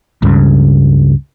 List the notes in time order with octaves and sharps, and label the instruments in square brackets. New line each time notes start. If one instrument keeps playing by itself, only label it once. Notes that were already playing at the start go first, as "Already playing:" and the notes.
[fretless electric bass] C#2 G2 C#3